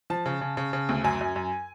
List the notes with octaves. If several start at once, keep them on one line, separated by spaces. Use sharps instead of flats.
F3 A5
C#3
C#3
C#3
C#3
D2
F#2 G#5
F#2
F#2